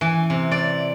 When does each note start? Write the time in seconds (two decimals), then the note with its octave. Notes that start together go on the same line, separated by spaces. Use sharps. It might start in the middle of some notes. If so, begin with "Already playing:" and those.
0.01 E3
0.30 C3
0.51 D5